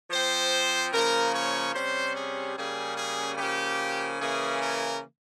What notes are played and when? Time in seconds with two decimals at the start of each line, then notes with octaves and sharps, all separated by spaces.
0.11 F3 C4 C5
0.92 C#3 F3 A#3 A#4
1.32 C#5
1.74 C3 G3 C#4 C5
2.14 G#4
2.55 C#3 G3 A#3 C#4 G#4
2.96 G#4
3.37 C#3 F3 A#3 G4
4.20 C#3 E3 A#3 C#4 G#4
4.60 A#4